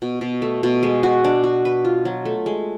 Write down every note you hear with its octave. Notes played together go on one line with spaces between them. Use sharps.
B2
B2
A3
B2
G#3
F#4
D4
F#4
B4
F4
F#3
A3
G#3